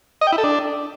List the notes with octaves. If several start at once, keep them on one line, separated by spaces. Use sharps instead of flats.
D#5
G5
E4
A4
D4